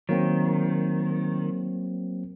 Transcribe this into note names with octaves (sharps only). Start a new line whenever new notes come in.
D#3 F#3 A#3 C4